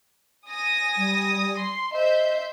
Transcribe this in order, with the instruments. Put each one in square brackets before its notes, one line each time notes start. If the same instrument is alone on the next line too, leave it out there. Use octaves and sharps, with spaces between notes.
[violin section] G#5 D#6 A#6
[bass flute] G3
[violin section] C6
[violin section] C5 E5 G6 [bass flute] D#5